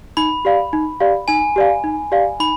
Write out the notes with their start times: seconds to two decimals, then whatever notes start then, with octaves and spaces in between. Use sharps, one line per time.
0.17 D#4 B5
0.45 G4 D5 F5
0.73 D#4
1.00 G4 D5 F5
1.28 D#4 G#5
1.56 G4 D5 F5
1.84 D#4
2.12 G4 D5 F5
2.40 D#4 B5